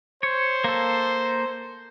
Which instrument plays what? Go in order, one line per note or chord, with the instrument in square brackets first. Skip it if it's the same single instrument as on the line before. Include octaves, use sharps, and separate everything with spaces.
[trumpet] C5 [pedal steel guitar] C#5
[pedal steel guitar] A#3 A4